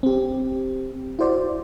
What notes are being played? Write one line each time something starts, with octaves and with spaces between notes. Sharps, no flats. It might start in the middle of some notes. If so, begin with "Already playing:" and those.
C4 G4
E4 F#4 C5 D5